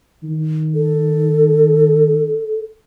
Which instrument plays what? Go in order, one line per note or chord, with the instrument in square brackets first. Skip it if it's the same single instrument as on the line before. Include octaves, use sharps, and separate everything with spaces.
[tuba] D#3
[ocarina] A4